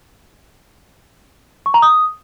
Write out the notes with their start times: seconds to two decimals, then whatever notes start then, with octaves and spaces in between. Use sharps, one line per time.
1.66 C#6
1.74 A#5
1.82 D#6